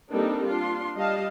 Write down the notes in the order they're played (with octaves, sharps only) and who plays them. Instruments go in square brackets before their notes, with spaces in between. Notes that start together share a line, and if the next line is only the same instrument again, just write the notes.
[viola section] G3 A#3 C4 D4 D#4 A4
D4 F4 C6
G3 D#5 F5 A5